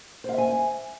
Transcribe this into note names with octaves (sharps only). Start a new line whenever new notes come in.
C5 E5 F5 G#5